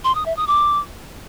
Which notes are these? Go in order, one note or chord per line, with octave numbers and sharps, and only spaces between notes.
C6
D#6
E5
D#6
D6